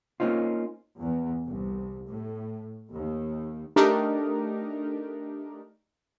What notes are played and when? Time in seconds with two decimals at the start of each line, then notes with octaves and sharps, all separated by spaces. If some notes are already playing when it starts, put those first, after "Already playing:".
0.20 A#3 C4 C#4 D#4 F4
1.01 E2
1.47 C2
2.07 A2
2.92 D#2
3.76 A3 D4 D#4 G4 A#4